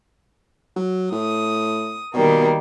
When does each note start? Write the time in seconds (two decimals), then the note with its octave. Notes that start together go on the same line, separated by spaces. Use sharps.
0.77 F#3
1.12 A2 D#6
2.14 B2 D#3 G3 A#3